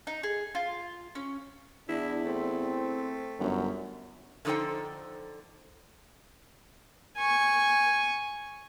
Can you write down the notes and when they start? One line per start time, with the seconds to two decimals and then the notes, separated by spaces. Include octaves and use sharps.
0.07 D#4
0.23 G#4
0.55 F4
1.15 C#4
1.89 E2 D4 E4
2.25 A3 C4
3.40 G1 F#2
4.45 D3 F3 D#4 A4 C5 G5
7.17 G#5 C#6